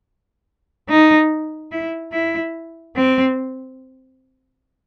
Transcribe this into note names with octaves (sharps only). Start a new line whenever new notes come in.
D#4
E4
E4
C4